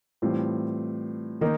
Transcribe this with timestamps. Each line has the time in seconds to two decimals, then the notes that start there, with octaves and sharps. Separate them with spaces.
0.22 A2 E3 G3 C4 F4
1.41 D#3 A#3 D#4